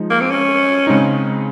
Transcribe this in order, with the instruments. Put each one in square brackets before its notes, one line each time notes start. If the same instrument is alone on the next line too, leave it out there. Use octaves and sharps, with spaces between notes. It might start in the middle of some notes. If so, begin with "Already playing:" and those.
Already playing: [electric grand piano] F3 G#3 D#4
[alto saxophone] A#3
C4
C#4
[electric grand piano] C#3 G#3 C4 D#4